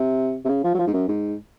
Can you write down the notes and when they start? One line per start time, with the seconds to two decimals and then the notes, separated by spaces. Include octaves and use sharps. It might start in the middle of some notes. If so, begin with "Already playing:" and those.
Already playing: C3
0.45 C3
0.48 C#3
0.64 F3
0.75 F#3
0.79 F3
0.87 G#2
0.93 F#2
1.08 G#2